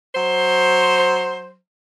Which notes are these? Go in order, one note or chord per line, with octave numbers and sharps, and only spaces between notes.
F#3 C5